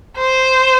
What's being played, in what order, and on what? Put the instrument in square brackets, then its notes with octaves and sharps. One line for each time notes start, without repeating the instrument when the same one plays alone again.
[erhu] C5